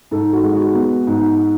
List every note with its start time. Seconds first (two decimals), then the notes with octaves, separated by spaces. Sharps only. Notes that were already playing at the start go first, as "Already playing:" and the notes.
0.11 G#2 A4
0.33 F#4
0.43 G#3
0.54 F#4
0.75 B3
1.07 G#2